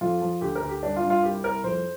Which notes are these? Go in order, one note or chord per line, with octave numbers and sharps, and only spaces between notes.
F2 F4
F3
D2 G4
A#4
D2
G4
G2 D4
F4
G2
F4
C2 G4
C2 A#4
F2 C5